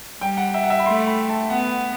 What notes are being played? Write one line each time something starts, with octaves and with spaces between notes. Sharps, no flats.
G3 G5
F#5
E5
F#5
E5
B5
A3 C6
B5
A5
B3 F#5